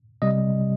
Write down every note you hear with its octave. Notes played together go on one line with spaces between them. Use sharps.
C3 G3 D#5